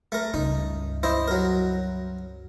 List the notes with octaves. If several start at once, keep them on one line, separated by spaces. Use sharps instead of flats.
A3 A#4
C#2 G2 D#4
E4 C5 D#5
F#3 A#4